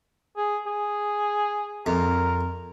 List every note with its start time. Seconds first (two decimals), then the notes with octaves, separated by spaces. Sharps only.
0.37 G#4
0.67 G#4
1.86 F2 A#4